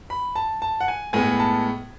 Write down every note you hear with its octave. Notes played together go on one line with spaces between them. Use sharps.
B5
A5
A5
F#5
G#5
A2 G#3 B3 G#5
A5